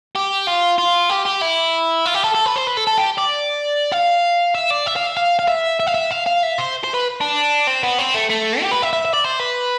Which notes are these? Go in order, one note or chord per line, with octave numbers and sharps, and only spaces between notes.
G4
F4
F4
G4
G4
E4
F4
G4
A4
A4
B4
C5
B4
A4
A4
G4
D5
F5
E5
D5
E5
F5
E5
F5
F5
E5
E5
F5
E5
F5
F5
E5
C5
C5
B4
D4
C4
B3
C4
A3
A3
G4
B4
E5
E5
E5
D5
C5
B4